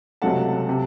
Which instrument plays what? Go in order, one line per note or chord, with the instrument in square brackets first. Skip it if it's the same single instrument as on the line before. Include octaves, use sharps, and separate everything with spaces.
[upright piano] C#2 C3 F#3 A3 F#5 A5
C3